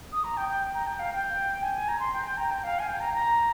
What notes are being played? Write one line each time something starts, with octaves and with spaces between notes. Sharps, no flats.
D#6
A#5
G5
G5
A#5
G5
F5
G5
G#5
G#5
A#5
C6
G5
G5
A#5
G5
F5
G#5
G5
A#5
A#5